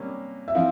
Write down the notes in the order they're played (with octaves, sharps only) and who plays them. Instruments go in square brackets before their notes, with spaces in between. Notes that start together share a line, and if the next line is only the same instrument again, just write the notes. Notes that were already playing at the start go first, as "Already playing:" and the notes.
Already playing: [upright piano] C3 G3 A#3 C#4
[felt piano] E5
[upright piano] F3 C4 E4 [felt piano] F5